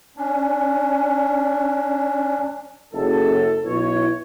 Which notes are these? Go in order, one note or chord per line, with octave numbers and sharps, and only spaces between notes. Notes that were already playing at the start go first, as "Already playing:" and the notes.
C#4 D4
F#1 A4
B1 E4 B4 C#5